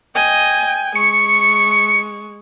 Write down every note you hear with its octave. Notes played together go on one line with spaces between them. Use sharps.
D#5 G5 G#5
G#3 C#6 C#7